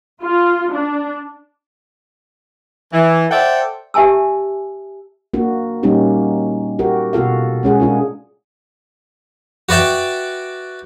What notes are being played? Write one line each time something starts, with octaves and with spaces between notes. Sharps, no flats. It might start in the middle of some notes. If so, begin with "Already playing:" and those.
F4
D4
E3
A4 C5 D5 E5 F#5 G5
G4 E5 G#5 A5 E6
A#3 D4 F#4
A#2 G3 A#3 C#4 D#4 G4
F#4 G4 A#4
B2 F4 F#4 A4 F5
G#3 C#4 G#4 F#5
D4 F4 A#4
F#4 B4 D5 E5 G5